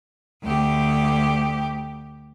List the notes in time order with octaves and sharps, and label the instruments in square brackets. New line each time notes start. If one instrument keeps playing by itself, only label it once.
[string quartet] D2 G4